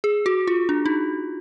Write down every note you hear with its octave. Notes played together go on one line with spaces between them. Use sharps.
G#4
F#4
F4
D4
D#4